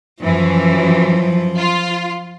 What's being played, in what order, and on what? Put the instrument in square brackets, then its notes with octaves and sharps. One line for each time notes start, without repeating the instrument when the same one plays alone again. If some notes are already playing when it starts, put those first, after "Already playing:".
[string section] F#2 E3 [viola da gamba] F3
[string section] F4